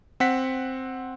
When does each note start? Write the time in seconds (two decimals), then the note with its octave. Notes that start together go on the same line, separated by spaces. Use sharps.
0.20 C4 F#5 B6